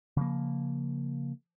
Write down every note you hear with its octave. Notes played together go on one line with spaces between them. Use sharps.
C#3 F3 A#3